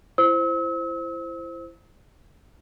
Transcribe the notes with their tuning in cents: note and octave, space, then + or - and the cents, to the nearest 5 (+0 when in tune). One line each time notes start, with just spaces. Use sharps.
E4 +30 C5 +0 E6 -40